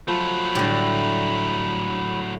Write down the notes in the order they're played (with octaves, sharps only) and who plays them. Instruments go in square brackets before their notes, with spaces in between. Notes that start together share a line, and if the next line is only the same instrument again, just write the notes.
[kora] F3 [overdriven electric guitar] F#3 A3 [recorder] B5
[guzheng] A2 D3 [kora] G3 G4